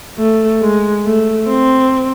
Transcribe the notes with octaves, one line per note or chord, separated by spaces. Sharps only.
A3
G#3
A3
C4